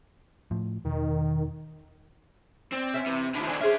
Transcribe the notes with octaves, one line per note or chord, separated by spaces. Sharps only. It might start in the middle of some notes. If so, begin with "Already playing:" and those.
A2 F3
E1 D#3
C4 D5
C#4 E5
C3 E3
D#2 D3 E4
D#3 D4 C5 G#5
D3 C#4 G#4 C5 E5